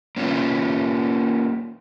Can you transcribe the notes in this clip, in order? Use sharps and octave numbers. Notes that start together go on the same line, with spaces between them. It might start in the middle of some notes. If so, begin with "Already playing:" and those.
A#3 C#4 D4 F4 B4